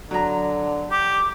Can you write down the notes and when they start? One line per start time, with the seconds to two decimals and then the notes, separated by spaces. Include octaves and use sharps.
0.11 D3 F#3 A#5
0.91 G4 D6